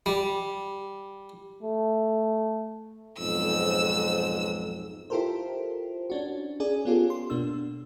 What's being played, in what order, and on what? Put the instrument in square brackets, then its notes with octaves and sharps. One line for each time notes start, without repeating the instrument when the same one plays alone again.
[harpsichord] G3
[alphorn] A3
[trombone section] B1 F2 G#2 [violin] E6
[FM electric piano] E4 F4 G4 A4 A#4 C5
C#4 D4 F#4
C#4 G#4 D5
B3 C#4 F4 G4 A4
C6
B2 A#3 D4 E6